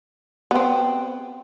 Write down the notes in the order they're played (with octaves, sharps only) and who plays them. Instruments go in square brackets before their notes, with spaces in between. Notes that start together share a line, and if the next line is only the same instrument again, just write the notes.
[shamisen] B3 C4